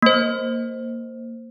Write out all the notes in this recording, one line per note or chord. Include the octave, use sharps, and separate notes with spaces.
A#3 C5